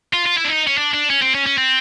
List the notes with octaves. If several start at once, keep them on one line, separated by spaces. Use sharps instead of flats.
F4
F4
E4
D4
D#4
C#4
D4
D4
C#4
C4
C#4
C#4
C4